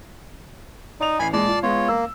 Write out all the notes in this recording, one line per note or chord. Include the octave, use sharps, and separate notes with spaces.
D#4 D5 F7
A1 G#5 B5 C7
A#2 G#3 D5 A5
F4
G#3 B3 F4 C#5
A#3 E6